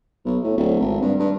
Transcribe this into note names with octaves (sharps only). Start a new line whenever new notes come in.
B1
A2
D1
G#1
G2
G2